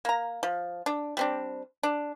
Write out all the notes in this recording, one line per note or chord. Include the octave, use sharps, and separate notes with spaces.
A#3 A#5
F3
D4
G3 C4 D4
D4